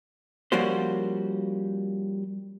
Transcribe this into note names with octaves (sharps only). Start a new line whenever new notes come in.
F3 G3 A#3 C#4 F#4 C5